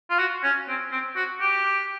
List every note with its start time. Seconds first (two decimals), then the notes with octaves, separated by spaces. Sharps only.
0.10 F4
0.18 F#4
0.43 C#4
0.68 C4
0.92 C4
1.16 F#4
1.41 G4